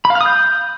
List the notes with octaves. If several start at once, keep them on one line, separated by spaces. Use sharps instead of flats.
B5
F5
F6
D#6
G6